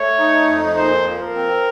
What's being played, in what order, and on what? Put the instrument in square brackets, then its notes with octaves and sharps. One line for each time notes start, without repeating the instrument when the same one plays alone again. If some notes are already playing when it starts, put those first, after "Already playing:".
Already playing: [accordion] A3 [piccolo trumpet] C#5
[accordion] D#4
F2
[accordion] A#2 [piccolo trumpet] C5
[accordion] F3
[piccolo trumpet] A#4
[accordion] C4